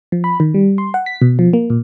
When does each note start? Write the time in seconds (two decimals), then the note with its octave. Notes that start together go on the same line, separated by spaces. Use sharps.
0.12 F3
0.24 B5
0.40 D#3
0.54 G3
0.78 C6
0.94 F#5
1.06 B6
1.22 B2
1.39 F3
1.53 A#3
1.70 A#2